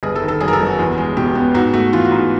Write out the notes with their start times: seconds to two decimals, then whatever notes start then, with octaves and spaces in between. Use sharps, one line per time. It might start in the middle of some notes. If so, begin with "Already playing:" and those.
0.03 G1 G#4
0.16 A4
0.22 D#3
0.28 A4
0.41 F#2 G#4
0.48 A#4
0.53 A4
0.60 G1
0.66 F#4
0.79 E2
0.98 G#3
1.17 B2 G4
1.35 B3
1.54 G#2 F#4
1.73 A3 F#4
1.93 E3 F4
2.05 F#4
2.12 G#2